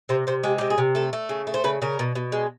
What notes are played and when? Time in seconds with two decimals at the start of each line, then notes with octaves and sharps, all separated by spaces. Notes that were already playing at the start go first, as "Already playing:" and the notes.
0.09 C3 C5
0.27 C3 C5
0.43 G#3 G4
0.58 C3 G4
0.70 G#4
0.78 C3
0.95 A3 A4
1.13 A3
1.29 C#3
1.47 A3
1.54 C5
1.64 C#3 B4
1.82 C#3 A#4
1.99 B2
2.15 B2
2.32 G#3